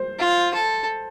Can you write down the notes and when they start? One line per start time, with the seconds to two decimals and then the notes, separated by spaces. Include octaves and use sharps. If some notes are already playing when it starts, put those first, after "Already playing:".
Already playing: C5
0.19 F4
0.54 A4